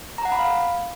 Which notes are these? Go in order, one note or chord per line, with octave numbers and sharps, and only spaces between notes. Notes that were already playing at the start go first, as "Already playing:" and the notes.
A#5
F#5
B5
F5